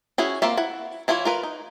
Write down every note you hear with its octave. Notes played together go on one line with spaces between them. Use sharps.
C#4 E4 F#4 G#4
A#3 C4 F4 E5
E4 F#5
E3 E4 F4 G#4 C#5
F4 A#4 B4
D#4